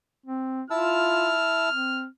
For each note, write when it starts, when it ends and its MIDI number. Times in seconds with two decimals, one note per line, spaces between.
0.26 0.62 60
0.70 1.69 64
0.70 1.32 65
0.70 1.69 81
0.70 1.69 88
0.70 2.07 89
1.69 2.06 60